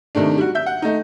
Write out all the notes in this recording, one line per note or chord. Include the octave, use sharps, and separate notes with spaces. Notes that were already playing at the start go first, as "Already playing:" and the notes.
C3 D#3 A3 D4
G3 F#4
E5 G6
F#5
A3 D#4